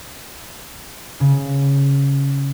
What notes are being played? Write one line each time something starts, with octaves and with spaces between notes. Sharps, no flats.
C#3